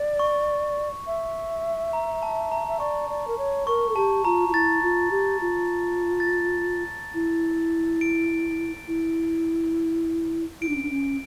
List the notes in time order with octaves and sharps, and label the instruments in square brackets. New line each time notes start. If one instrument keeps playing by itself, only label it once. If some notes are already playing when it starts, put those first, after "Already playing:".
Already playing: [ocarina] D5
[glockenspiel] C#6
[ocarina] E5
[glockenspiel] A#5
A5
A#5
[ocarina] E5
[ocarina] D5 [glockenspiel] C#6
[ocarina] D5
A#4
C#5
[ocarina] A#4 [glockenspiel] C#6
[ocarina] A4
[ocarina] G4 [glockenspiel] A5
[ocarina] F4 [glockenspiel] A#5
[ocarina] F4
[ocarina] E4 [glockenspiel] A6
[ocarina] F4
G4
F4
[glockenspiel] A6
A#6
[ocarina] E4
[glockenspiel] D7
[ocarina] E4
[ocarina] E4 [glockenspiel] D7
[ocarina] D4
C#4
D4
C#4